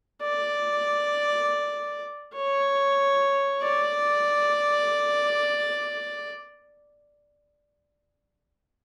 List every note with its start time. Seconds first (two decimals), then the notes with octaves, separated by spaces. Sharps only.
0.23 D5
2.35 C#5
3.63 D5